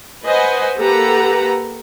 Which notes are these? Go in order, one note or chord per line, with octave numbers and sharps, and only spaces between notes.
B4 C5 D#5 F#5 G#5
A#3 G4 A4 B4 F#5 A#5